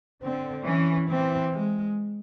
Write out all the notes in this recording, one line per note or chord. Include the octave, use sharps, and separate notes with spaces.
D3 C4
E3 C#4
E3 C4
G#3